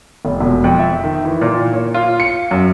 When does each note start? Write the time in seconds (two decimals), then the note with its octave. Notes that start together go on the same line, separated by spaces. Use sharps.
0.25 F1
0.41 E1
0.64 F2
0.79 E5
1.04 D#3
1.25 E3
1.41 A#2
1.74 C#5
1.94 F4
2.20 C#7
2.51 F#2